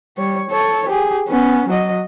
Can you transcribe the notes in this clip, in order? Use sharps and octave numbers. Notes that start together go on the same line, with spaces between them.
G3 C#5
A4 C#5
G4 G#4
B3 C#4
F#3 D#5